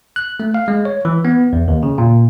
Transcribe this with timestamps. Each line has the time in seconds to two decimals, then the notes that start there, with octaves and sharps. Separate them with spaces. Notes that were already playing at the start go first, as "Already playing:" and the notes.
0.16 F#6
0.40 A3
0.54 F5
0.68 G#3
0.85 C#5
1.05 E3
1.25 B3
1.53 E2
1.68 D#2
1.83 C#3
1.98 A#2